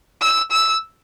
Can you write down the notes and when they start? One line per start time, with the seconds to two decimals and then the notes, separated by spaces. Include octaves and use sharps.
0.21 E6
0.51 E6